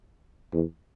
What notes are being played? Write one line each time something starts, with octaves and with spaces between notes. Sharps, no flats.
E2